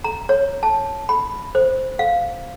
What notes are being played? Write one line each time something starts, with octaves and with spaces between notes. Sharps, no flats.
A#5
C#5
A5
B5
C5
F5